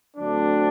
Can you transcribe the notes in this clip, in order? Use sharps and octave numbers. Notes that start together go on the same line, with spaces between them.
D2 D3 F#3 A3 C4 D4